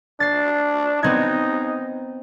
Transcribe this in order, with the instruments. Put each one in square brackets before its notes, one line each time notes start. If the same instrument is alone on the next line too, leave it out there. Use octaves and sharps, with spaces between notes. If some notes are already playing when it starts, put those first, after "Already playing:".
[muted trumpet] D4 [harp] A6 C7
[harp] B3 C4 G#6 [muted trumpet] D#4